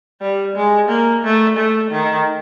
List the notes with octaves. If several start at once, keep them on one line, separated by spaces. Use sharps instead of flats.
G3
G#3
A#3
A3
A3
D#3